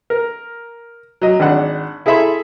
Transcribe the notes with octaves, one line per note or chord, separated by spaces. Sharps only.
A#4
F#3 D#5
G#1 D4 F#5
E4 G#4 A4 E5 B5 C6